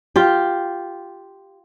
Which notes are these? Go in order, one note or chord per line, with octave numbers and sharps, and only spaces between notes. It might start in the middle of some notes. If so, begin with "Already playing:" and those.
F4 G4